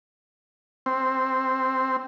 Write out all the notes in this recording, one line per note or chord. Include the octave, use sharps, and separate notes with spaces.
C4